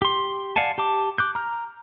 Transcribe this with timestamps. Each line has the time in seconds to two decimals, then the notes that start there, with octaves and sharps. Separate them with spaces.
0.02 G4 C6
0.56 D5 F5 F#5 G#5 A5
0.78 G4 A5 D6
1.18 D6 F#6 G6
1.35 A#5 F6